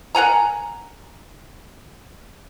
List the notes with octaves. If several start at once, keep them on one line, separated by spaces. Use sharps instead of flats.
A#4 F#5 G#5 A#5